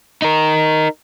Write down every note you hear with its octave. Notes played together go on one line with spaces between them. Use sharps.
D#4 A#4